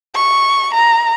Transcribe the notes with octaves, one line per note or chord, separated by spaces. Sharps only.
C#6
A#5